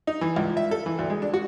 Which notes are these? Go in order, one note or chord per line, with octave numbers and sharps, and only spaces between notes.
D#4
E3
C#2
E5
A4
E3
D2
G#3
D4
F#4